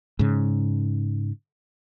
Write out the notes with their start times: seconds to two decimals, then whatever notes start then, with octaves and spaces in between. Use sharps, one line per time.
0.19 G#2 C#3